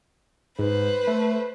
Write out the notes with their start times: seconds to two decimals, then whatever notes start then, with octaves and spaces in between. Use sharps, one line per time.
0.59 G#2 B4 C5
1.07 A3